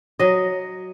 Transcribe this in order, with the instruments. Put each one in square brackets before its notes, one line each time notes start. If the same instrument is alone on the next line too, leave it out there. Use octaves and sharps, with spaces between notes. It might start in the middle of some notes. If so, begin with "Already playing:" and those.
[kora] F#3 D#5